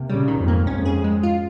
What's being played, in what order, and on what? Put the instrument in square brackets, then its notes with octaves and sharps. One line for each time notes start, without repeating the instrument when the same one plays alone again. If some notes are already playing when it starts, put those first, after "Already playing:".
Already playing: [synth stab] C3 A#3
[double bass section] A#2 C#3 [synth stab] G3
[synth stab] D#3
[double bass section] F2 G#2
[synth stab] A#3
[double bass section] F2 G#2 [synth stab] C#4
[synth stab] G#4
G#3
F4